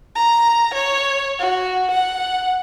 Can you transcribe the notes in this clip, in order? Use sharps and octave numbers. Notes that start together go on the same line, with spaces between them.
A#5
C#5
F#4
F#5